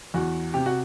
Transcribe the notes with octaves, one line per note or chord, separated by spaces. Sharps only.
E2 F#4
C3 G4
F#4